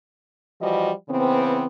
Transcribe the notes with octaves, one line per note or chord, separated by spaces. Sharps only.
E3 F3 G3 F#4 D#5
C#3 E3 B3 C4